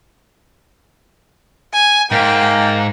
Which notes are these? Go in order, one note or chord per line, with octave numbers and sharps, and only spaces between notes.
G#5
G#2 A#3 G5